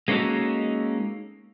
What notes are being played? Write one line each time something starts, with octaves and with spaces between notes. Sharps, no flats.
G#3 A#3 C#4 D#4 F#4 A4